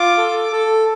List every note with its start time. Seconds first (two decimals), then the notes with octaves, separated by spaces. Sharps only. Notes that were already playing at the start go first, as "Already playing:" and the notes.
Already playing: F4 D6
0.18 A4
0.52 A4